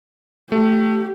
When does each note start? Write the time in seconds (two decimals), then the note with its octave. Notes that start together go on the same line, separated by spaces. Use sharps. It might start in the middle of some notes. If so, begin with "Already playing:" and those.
0.52 A3 G4